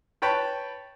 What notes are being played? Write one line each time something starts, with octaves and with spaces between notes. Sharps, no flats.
B4 C#5 G5 A5 B5